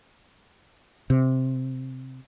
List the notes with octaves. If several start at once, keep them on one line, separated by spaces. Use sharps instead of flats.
C3